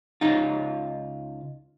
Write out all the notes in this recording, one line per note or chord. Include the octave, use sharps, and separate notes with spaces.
C#2 D#4 F4